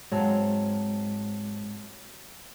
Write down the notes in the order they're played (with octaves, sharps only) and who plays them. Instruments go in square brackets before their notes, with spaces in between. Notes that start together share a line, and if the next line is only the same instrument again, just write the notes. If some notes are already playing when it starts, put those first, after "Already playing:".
[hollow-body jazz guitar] G#2 [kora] F#3 C4 F5 [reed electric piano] G#3 A5